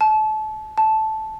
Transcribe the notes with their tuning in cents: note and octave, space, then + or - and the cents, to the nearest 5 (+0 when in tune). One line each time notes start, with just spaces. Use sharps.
A5 -30
A5 -10